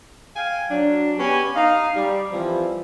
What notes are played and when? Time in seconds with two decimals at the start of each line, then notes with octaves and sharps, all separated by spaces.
0.36 F5 G5 G#5
0.71 F#3 D4
1.18 B3 C#4 G4 B4 G#5
1.56 D#4 F5
1.96 G3
2.31 E3 F3 G3 C4 E4